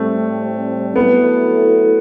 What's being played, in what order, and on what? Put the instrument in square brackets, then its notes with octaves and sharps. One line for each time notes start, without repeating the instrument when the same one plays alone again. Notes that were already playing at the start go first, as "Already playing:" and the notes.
Already playing: [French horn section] A2 G3 C4 [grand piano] A3
[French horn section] F#3 A3 E4 A4 [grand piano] B3